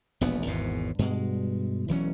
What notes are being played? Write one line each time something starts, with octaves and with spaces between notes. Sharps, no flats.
E1 A#1 D#2 B3
G#1 E2 G#2 B2
G2 B2 G#3
E1 E3 F#3 C#4